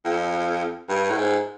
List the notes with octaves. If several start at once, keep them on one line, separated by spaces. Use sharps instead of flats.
F2
G2
A2
G#2